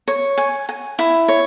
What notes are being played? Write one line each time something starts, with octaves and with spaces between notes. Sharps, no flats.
C#5
G#5
G#5
E4
C#5